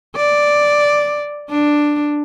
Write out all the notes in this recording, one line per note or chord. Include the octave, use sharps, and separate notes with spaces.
D5
D4